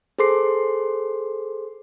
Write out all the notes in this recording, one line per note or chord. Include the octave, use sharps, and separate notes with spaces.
G#4 A4 C5 C6 D6 C7